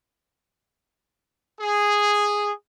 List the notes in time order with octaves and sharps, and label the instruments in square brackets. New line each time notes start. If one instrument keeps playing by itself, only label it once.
[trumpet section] G#4